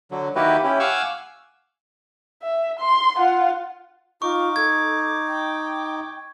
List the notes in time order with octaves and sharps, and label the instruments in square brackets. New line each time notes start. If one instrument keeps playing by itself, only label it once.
[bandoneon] D3 F#3
D#3 A#3 E4 F#4 G4 B4
C#4 E4 G4
F5 F#5 G#5 C#6 D6 E6
[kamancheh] E5
C6
F4 F#5
[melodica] D#4 D6 [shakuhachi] F4 [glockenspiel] C#6
[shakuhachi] A4 [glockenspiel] G#6
[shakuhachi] G5